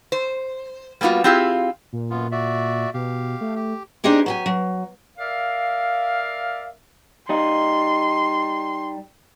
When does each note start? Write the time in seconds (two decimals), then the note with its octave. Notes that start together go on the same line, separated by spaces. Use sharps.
0.12 C5
1.01 G3 A#3 B3 F4 F#4
1.24 C4 E4 F4 G4 G#4 F5
1.93 A#2
2.10 F#2 B3 F4
2.32 F#4 D5 E5
2.94 B2 G4 F5
3.41 A3
3.56 G4
4.04 C4 D4 D#4 G4 G#4
4.26 F#3 G4 G#5
4.46 F#3
5.18 A#4 D5 E5 F5
7.29 G3 D#4 C6